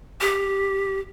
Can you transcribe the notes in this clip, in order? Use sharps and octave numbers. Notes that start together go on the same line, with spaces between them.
G4